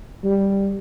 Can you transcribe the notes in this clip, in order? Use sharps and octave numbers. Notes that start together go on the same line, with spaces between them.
G3